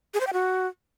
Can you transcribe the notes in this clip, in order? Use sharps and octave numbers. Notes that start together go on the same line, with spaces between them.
G#4
C5
G5
F#4